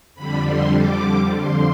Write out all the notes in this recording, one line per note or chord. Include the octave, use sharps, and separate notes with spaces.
F2 D3 G3 B5
C6
D6
F2 D3 F3 C6